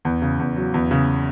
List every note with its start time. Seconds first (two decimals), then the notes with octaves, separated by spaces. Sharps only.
0.05 E2
0.22 C#3
0.39 E2
0.56 F#3
0.74 E2
0.91 C#3